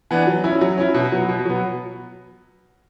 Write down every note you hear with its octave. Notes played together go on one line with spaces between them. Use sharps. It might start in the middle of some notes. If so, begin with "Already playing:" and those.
E3 B3 D4
F#3
C#4 E4
F#3
C#4 E4
B2
F#3 B3
B2
F#3 B3